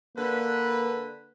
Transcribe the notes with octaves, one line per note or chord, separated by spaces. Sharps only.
D3 A#3 D4 B4